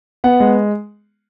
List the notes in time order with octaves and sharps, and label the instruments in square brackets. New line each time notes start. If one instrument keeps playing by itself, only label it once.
[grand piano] B3 F#5
G#3